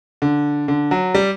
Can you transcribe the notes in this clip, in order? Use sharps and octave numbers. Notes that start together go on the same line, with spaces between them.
D3
D3
F#3
G3